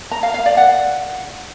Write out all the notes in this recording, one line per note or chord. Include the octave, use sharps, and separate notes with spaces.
A#5
F5
F5
D5
F#5